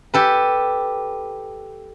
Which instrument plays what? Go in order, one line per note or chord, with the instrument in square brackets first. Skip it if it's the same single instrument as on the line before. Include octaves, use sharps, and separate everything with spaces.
[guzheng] G4 A4 B4